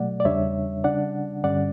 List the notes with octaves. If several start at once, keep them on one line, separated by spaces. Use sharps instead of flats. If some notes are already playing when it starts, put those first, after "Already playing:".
Already playing: B2 F#3 A3 D5 F#5
D5
E2 C#3 G3 D4 C#5 E5
C#3 G3 D4 D5 F#5
G2 D3 G3 C#4 D5 F#5